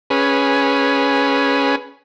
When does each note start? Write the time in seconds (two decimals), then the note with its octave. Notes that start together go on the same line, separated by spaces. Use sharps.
0.10 C#4 G#4 B4